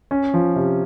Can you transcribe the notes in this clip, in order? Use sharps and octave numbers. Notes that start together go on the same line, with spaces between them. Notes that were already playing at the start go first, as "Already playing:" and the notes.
C#4
F3
C3